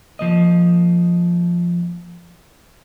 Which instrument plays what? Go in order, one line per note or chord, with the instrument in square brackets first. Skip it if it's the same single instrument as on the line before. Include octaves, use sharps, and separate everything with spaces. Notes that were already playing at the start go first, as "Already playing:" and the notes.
[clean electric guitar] F3 A#3 D#5